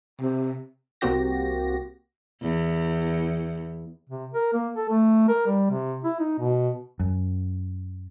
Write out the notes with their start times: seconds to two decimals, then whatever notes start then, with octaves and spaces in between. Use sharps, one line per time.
0.21 C3
1.01 C2 A#3 C4 F#4 G4 A#6
2.43 E2
4.09 C3
4.34 A#4
4.53 A#3
4.76 A4
4.89 A3
5.28 A#4
5.47 G3
5.70 C3
6.04 E4
6.20 D#4
6.39 B2
7.00 F#2